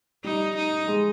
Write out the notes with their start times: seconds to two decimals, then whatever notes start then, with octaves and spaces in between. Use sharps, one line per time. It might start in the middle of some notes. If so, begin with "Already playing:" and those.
0.24 G3 D#4
0.56 D#4
0.88 G#3